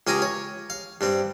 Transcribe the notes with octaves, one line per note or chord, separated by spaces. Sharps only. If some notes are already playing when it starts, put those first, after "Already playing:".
C#2 C#4 G4 G#4 G#5 A#5
C#5
F5
G2 G3 C4